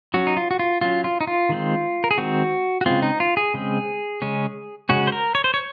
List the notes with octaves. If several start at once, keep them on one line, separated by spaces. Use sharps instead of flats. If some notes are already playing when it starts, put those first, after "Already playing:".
F#3 C#4 F#4
D#4
F4
F#4
F4
F#3 C#4 F4
F4
D#4
F4
D#3 G#3 C4
A#4
G#4
D#3 G#3 C4 F#4
F#4
C#3 G#3 C4 F4
D#4
F4
G#4
C#3 G#3 C4
C#3 G#3 C#4
C#3 G#3 C#4 F#4
C5
A#4
C#5
C5
C#5